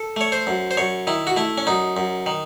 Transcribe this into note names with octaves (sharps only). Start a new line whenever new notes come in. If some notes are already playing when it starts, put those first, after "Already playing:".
Already playing: A4
A3 C#5
C5
F#2
C5
F#2 C#5
D#3 E4
F#4
A3 E4
C#4
F#2 D#4
F#2
D#3